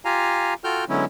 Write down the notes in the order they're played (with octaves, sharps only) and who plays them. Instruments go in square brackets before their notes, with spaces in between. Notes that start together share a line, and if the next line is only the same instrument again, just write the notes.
[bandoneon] F4 G4 F5 G#5 A#5
F4 F#4 A4 G5 F6 G6
D3 F#3 G#3 B3 C#4 E4